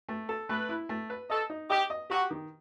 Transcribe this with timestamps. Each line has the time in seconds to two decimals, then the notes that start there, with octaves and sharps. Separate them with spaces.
0.09 A3
0.29 A4
0.48 A3 B4
0.69 E4
0.89 A3
1.10 B4
1.29 A4 D#5
1.50 D#4
1.70 G4 D#5
1.90 D#5
2.10 F#4 G4
2.31 D#3